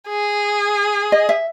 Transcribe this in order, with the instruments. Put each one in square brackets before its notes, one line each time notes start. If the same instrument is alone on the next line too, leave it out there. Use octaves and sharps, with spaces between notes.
[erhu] G#4
[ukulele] D#5
E5